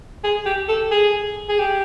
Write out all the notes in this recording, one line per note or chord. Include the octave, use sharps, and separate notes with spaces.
G#4
G4
A4
G#4
G#4
G4